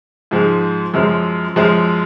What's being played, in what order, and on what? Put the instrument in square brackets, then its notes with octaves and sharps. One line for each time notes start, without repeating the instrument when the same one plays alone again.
[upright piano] G#2 F3 G#3
F#2 F3 G#3
F#2 F3 G#3